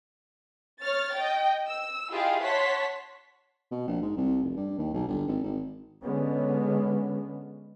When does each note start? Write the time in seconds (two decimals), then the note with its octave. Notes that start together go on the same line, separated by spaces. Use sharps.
0.83 C#5 F6 A6
1.16 D#5 G5
1.66 E6
2.12 E4 F4 G4 G#4 D#5 F5
2.43 C#5 F#5 A5 C6 B6
3.71 B2
3.87 A#1
4.02 G#2
4.17 C2
4.43 F1
4.56 G2
4.78 D#2
4.94 B1
5.08 G1
5.27 G#1
5.44 G#1
6.03 D3 G#3 B3 C#4